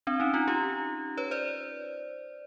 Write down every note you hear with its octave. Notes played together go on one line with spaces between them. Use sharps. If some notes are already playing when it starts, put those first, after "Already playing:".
C4 D4
C#4 D#4
D#4 F4
F4 G4
B4 C#5
C5 D5